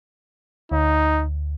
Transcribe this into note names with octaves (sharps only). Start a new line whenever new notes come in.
D2 D#4